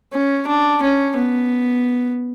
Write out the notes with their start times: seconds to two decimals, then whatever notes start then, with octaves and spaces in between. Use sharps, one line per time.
0.13 C#4
0.47 D4
0.82 C#4
1.17 B3